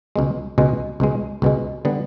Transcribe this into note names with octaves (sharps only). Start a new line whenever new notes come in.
C#2 B2 G#3
C#2 B2 G#3
C#2 B2 G#3
C#2 B2 G#3
D3 G3 B3